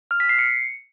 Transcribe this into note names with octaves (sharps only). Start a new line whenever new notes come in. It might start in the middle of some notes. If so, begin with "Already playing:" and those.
F6
B6
C7
C#7